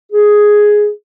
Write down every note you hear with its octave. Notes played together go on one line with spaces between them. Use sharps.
G#4